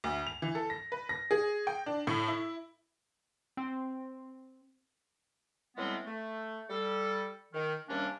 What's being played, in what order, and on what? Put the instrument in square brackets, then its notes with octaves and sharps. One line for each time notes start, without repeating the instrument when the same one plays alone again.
[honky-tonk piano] D2
F7
E3
A4
A#6
B4
A#6
G#4
G5
D4
A2
E4
[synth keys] C4
[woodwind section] A2 E3 G3 G#3 B3 C4
A3
G3 A4
D#3
D#2 C3 G3 A#3 C#4 D4